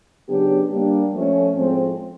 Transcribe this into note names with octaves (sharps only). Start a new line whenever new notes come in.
C#3 F#3 B3 D4 G4
G3 A#3 D4
F3 A3 C#4
A2 F3 G#3 C4